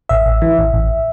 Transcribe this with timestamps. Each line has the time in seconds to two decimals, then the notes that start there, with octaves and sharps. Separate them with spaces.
0.09 A1 E5
0.25 A1
0.42 E3
0.58 A1
0.73 A1